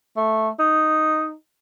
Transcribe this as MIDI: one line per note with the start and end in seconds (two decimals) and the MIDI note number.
0.17 0.49 57
0.59 1.33 63